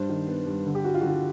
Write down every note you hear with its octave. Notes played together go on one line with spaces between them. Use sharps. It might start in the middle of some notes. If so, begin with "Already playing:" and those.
Already playing: G2 D4 C5
D#3
B3
G2
D3
G4
G3 F#4
F4
D3 F#4
F4